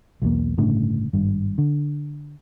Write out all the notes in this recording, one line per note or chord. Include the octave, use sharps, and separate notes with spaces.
B1 E2 A#3
G1 A2 C#3 D4
G#1 G2
D3